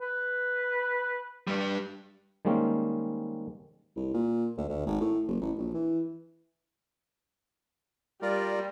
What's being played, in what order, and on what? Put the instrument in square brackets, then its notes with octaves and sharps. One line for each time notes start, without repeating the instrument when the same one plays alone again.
[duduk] B4
[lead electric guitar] G2 G3
[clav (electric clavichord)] D#3 G3 G#3 A#3 C4 C#4
[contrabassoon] C2
A#2
D2
D2
G#1
A2
F#1
A1
A#1
E3
[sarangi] G3 [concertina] F4 A#4 D5